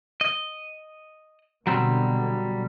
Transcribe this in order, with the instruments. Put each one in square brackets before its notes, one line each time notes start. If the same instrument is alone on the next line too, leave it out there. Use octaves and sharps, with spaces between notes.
[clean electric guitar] D#5
[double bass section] B2 D3 [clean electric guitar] F#3 G3 C4